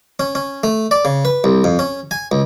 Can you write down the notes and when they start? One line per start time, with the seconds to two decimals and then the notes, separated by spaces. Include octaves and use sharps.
0.20 C#4
0.35 C#4
0.63 A3
0.91 D5
1.05 C#3
1.25 B4
1.44 C2
1.64 F2
1.79 C#4
2.11 G#5
2.32 C#2